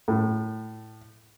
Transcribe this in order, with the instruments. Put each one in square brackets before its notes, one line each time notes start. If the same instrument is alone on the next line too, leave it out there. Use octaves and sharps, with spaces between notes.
[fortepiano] A2